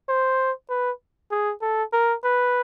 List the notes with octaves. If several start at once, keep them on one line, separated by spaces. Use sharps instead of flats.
C5
B4
G#4
A4
A#4
B4